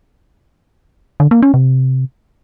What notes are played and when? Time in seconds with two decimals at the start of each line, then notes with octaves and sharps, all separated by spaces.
1.20 D3
1.31 A#3
1.42 C#4
1.54 C3